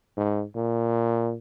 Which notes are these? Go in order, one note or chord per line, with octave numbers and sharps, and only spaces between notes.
G#2
A#2